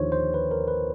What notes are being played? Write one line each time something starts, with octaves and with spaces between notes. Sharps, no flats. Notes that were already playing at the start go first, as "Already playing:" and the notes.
Already playing: D#2 D3 F3 C5 C#5
C5
B4
A#4
B4